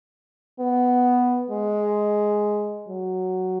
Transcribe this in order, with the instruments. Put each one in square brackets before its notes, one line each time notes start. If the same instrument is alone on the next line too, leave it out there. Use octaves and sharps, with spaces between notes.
[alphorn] B3
G#3
F#3